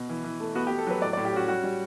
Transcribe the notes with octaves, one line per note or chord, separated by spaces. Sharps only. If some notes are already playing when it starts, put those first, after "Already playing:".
Already playing: B2
E3
E3
A3
B3 F#4
G4
B3
A4
F#3 B4
A2 D5
D5
A2
G4
C#4 F#4
G3 F#4
G3